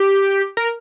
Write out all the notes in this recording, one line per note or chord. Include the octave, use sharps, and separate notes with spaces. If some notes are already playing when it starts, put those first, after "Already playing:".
Already playing: G4
A#4